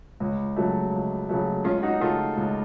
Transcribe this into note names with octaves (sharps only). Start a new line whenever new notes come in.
C#2
C#3 F#3 A3
C#2
C#3 F#3 A3
C#2 C#4 F4
D#4 F#4
C#3 A3 F4 A4
C#2